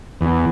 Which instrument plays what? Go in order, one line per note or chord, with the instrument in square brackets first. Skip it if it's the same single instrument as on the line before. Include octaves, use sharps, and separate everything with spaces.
[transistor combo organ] E2